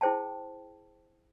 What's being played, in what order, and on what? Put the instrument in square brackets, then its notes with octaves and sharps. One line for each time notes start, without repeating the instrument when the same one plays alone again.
[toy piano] E4 G#4 C5 G5 A5